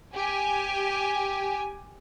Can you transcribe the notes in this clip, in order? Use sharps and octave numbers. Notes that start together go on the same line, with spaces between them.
G4 G#5